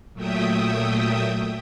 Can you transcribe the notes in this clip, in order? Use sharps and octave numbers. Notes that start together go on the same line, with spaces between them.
A#2 F#3 A3 E5 G5 D#6